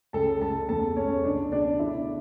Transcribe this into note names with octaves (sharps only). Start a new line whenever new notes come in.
C#2 A4 A5
C#2 A4 A5
E2 A4 A5
E2 C#4 C#5
C#2 D4 D5
B2 D4 D5
D3 E4 E5